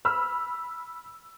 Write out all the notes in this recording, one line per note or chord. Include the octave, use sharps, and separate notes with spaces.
B5 E6 F6